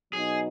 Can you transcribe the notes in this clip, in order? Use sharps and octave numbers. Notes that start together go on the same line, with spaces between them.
B2 F#3 B3 D#4 G#4